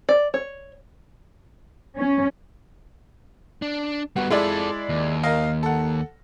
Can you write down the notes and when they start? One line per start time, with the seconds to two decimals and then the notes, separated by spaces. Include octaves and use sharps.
0.09 D5
0.34 C#5
1.98 C#4
3.62 D4
4.16 G3 B3 F#4
4.30 G#3 E4 F4 A4 D5
4.89 D#2
5.23 A#4 D#5 F5
5.63 A4 F#5